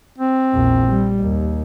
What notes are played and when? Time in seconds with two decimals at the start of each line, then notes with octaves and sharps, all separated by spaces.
0.18 C4
0.53 A#1 E2
0.88 G3
1.20 D#2